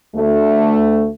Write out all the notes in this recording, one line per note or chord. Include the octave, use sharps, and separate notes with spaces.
D2 A3